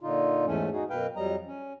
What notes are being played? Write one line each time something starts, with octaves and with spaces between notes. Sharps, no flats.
A#2 D3 D#4 F4
E2 G#2 E3 A3 C#4
D#4 F#4 G#4
F#2 B2 B4 F5 G5
F2 F#3 G3 D#5 A#5
C#4